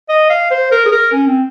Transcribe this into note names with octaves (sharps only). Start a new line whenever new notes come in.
D#5
F5
C5
A#4
G#4
A#4
C#4
C4